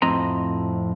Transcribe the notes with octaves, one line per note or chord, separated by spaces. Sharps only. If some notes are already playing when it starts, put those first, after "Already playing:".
F2 A2 C4 D#5 A#5